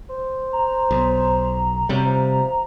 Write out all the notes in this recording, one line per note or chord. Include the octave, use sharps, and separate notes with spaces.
C5
A#5
B1
C3 F#3 G3
F3